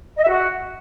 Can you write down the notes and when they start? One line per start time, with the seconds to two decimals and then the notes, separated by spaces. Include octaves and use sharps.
0.16 D#5
0.22 E5
0.28 F#4